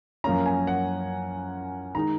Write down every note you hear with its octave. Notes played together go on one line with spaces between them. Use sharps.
F#2 F3 A#3 C#4 A#5
G#5
F#5
D#3 G#3 D#4 A#5